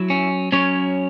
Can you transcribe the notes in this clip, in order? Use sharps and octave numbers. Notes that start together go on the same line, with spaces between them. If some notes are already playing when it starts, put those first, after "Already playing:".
Already playing: F#3 E4
C#4
F#3 C#4 C#5